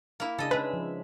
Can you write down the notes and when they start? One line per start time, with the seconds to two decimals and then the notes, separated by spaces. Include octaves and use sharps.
0.20 A#3 E4
0.38 C#3 D4 G#4 A4 D#5
0.51 G#3 C#4 D#4 B4 E5
0.73 F3